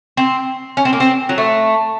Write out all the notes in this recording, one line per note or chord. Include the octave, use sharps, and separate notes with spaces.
C4
C#4
C4
A#3
C4
F#3
A3